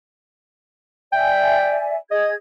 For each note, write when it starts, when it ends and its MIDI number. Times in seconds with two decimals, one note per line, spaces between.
1.13 1.96 74
1.13 1.96 76
1.13 1.80 79
1.13 1.96 80
2.11 2.34 68
2.11 2.30 75
2.11 2.34 92